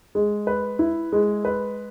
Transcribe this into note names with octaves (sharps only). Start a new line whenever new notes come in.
G#3
B4
E4
G#3
B4